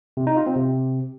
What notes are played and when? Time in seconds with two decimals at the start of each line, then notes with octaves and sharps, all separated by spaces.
0.17 C3
0.27 D#4
0.37 F4
0.46 C4
0.56 C3